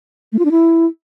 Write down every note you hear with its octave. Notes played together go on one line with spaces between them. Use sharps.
A3
F4
D4
E4